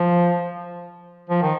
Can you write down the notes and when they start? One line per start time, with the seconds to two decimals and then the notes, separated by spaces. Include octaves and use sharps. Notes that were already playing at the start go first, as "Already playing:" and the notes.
Already playing: F3
1.30 F3
1.42 D#3